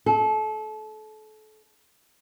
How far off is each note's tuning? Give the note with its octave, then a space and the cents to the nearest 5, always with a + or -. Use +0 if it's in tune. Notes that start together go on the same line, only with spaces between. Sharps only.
A4 -30